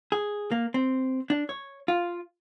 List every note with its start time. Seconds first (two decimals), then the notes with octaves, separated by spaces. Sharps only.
0.12 G#4
0.52 A#3
0.74 C4
1.30 D4
1.49 C#5
1.88 F4